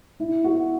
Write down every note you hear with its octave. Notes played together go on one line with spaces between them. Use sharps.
E4
F#4